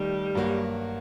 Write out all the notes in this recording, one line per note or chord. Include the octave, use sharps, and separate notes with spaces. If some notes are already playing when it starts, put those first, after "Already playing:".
Already playing: D#3 G3 A3 D#4 G4
G2 F#3 A#3 F#4